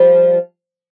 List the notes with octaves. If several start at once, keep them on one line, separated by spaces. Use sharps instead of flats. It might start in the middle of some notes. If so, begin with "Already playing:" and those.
Already playing: F3 G3